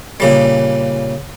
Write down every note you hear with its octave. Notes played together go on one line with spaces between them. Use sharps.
A#2 C#3 G3